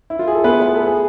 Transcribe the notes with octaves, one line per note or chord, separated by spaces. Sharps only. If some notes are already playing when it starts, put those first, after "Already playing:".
E4
F4
G#4
A4
B3 B4
B4
A4
G#4